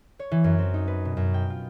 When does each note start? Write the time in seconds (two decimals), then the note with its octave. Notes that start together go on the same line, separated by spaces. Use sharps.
0.19 C#5
0.31 E3
0.44 F#2
0.59 C4
0.74 D#4
0.88 B4
1.05 B2
1.17 F#2
1.34 G5
1.50 F4